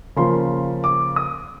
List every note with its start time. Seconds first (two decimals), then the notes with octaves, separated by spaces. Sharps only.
0.16 C#3 F3 A#3 C6
0.84 D6
1.16 D#6